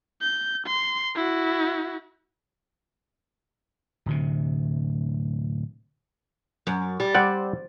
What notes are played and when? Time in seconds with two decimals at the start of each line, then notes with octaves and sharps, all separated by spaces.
0.22 G6
0.67 C6
1.15 E4 F#4
4.06 D1 D2 C3
6.67 F#2
7.00 G3
7.15 G3 C4 D5 F#5